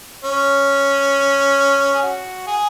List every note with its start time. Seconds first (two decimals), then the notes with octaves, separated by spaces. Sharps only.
0.24 C#4
1.95 G#4
2.02 F#4
2.47 G#4